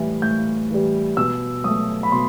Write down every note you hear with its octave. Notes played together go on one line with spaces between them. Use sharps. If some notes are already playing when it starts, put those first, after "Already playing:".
Already playing: A2 E3 G3
A2 G6
E3 G3
B2 E6
F#3 A3 D#6
B5
B2 C6